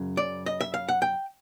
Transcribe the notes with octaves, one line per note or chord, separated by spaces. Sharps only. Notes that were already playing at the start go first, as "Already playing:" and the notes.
Already playing: F#2 C#3
D5
D#5
E5
F5
F#5
G5